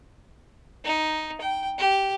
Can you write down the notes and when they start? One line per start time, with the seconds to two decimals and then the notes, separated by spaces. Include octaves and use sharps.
0.85 D#4
1.41 G5
1.78 G4